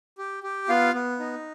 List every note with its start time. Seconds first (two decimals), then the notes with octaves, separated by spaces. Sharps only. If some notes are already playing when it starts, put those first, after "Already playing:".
0.18 G4
0.43 G4
0.69 B3 F4 F5
0.94 B3
1.20 D#4